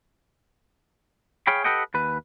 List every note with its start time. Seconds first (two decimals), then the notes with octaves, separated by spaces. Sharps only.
1.47 G#4 C#5 F5 G5 B5
1.64 G4 A4 B4 D#5 F#5 G5
1.94 D#2 B4